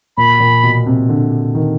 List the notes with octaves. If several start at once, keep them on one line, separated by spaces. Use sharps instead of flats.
A#2 B5
A#2
B2
C3
D3
D#3